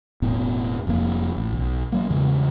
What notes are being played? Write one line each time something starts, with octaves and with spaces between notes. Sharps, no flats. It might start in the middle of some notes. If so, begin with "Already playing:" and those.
E1 A2 B3
F1 F2 A#2 A#3
A1
B1
F#3 A#3
E2 C#3 E3 G#3